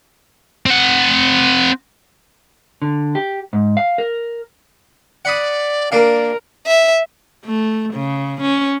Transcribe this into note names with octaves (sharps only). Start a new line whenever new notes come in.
C4 F#5
D3
G4
G#2
F5
A#4
D5 F#5 B5 D#6
A#3 D4 A#4 D5 F5
E5
A3
C#3
C#4